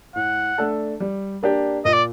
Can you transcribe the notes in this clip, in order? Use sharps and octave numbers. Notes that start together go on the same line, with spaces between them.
A2 F#5
A3 D4 A4
G3
A#3 D4 G4
A#2 D#5
D5